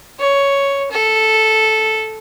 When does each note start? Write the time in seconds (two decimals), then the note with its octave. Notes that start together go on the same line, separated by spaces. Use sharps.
0.19 C#5
0.91 A4